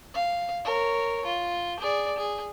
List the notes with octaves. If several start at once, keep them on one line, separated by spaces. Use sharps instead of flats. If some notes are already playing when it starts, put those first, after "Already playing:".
F5
A#4 C#5
F4
G#4 D5
G#4